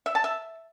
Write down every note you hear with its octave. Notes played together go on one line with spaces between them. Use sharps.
E5
A5
E5